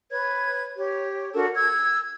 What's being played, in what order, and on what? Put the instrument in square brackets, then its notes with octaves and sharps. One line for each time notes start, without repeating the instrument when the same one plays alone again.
[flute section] B4 C#5 G#6
G4 C#5
D4 F#4 A4 A#4
E6 G#6